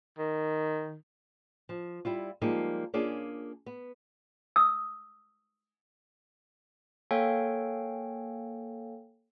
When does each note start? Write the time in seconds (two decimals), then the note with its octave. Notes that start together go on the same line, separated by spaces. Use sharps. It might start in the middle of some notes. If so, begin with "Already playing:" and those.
0.18 D#3
1.69 F3
2.05 G3 E4 F4
2.42 F3 G3 G#3 A#3 D#4
2.94 A#3 C#4 D4 F4 G#4
3.66 B3
4.56 D#6 E6
7.11 A#3 A4 C#5 F5 G5 G#5